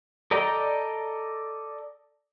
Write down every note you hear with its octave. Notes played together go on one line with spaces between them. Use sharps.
A4 D5 D#5 G5 A#5